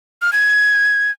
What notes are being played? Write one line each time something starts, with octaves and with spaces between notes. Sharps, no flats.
F6
G#6